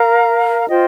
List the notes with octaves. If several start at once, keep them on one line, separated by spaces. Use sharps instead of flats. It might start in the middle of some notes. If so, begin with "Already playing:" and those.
Already playing: A#4 F5 A#5
F4 C5 D#5 G5